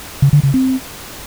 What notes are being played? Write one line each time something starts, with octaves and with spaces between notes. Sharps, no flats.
C#3
D3
C#3
C4